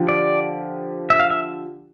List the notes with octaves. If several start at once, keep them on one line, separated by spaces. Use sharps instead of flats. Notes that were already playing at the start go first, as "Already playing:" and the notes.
Already playing: D3 F3 G4
D5
E5
F5
E5